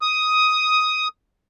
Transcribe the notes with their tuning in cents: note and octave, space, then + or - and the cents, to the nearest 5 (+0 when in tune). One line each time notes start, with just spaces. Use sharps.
D#6 +10